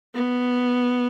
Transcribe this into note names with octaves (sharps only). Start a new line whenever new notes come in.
B3